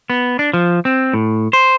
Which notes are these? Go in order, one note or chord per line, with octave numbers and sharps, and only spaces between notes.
B3
D4
F3
C4
A2
C5